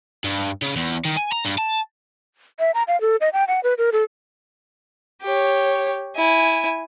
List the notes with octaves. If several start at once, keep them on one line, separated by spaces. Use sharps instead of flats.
G2
C#3
E2
D#3
G#5
A#5
G2
A5
E5
A#5
F5
A4
D#5
G5
F#5
B4
A#4
A4
G4 C#5
E4 G#5